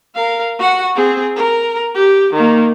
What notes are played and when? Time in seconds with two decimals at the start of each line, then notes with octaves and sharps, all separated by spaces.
0.15 A#4 F5
0.59 F#4 F#5
0.95 C4 G#4
1.36 A#4
1.95 G4
2.33 D#3 A#3